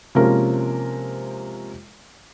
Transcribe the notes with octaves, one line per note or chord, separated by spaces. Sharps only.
C3 F3 G#3 A#3 C#4 A#4